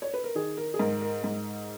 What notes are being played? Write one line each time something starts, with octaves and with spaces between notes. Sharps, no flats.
C#5
B4
A#4
D#3 G#4
A#4
G#4
G#2 A#4
A#4
G#2